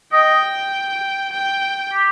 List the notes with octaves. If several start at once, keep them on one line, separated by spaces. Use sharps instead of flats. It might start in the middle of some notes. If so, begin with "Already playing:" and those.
D#5 G5
G5
G4